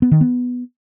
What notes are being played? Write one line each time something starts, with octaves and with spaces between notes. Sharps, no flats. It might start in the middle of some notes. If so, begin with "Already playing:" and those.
B3
D#3
B3